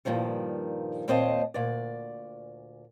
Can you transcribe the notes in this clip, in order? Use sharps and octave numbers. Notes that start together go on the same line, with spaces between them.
G2 A#2 D#3 F3 G3
D#2 A#2 C4 C5 D#5 A5
D2 A#2 D5